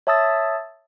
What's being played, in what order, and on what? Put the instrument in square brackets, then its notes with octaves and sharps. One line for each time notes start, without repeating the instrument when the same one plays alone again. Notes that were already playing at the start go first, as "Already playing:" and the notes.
[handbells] C#5 E5 A5 D#6 E6 A6